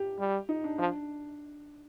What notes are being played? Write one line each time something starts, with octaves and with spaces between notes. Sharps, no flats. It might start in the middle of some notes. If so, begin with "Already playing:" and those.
Already playing: G4
G3
D#4
D4
F3 D4